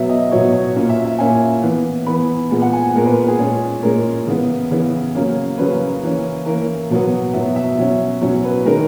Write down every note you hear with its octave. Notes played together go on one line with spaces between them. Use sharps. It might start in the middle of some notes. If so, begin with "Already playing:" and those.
Already playing: B2 F#3 B3 E5
D#5
B2 F#3 B3 C#5
C#5
A#2 A#3 C#4
E5
E5
A#2 A#3 C#4 G#5
E3 B3
E3 B3 B5
A#2 G#3 B3
F#5
G#5
A#2 G#3 B3 A#4
B4
G#4
A#2 G#3 C#4
A#2 G#3 C#4 A#4
C#3 E3 B3
C#3 E3 B3
C#3 F#3 A#3 C#4
C#3 F#3 A#3 C#4 B4
E3 A#3 C#4
E3 A#3 C#4 A#4
B2 F#3 B3
B2 F#3 B3 E5
E5
B2 F#3 C#4
B2 F#3 C#4
B4
D#3 G#3 C#4 A#4